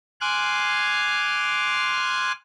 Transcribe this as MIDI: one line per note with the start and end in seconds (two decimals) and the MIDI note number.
0.21 2.32 80
0.21 2.32 84
0.21 2.32 86
0.21 2.32 89
0.21 2.32 90